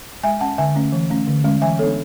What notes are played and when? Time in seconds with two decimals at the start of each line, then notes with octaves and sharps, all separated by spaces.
0.23 G#3 E5 G#5
0.41 C#4 F#5 A5
0.58 D3 E5 G#5
0.76 A3 C#4
0.92 E3
1.10 A3 C#4
1.27 D3
1.44 G#3 C#4
1.62 E3 E5 G#5
1.79 B3 D4 A4 C#5